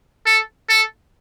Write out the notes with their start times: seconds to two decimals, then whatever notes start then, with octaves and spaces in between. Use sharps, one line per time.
0.26 A4
0.69 A4